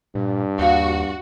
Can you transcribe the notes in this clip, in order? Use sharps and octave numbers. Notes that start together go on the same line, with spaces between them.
G2 A#2
D#2 F#4 G4 F5